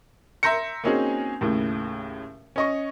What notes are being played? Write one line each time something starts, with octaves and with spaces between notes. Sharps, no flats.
E5 A#5 C6 G6 A#6 C#7
A#3 C4 C#4 D#4 F#4 G#4
D#2 A2 C#3
C#4 D#5 C#6